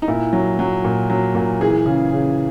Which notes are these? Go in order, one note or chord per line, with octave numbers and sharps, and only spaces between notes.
D#4
A#2 E4
F#3
F#3
A#2
F#3
A#2
E3 G#4
C#3
C#3